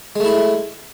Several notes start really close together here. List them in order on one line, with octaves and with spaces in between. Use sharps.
G#3 A3 E4